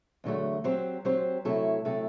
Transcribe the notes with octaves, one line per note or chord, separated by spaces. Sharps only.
E2 D3 F#3 A3
F#3 C4 G4 C5
F#3 C4 G4 C5
C3 F#3 A3 E4 A4
C3 F#3 A3 E4 A4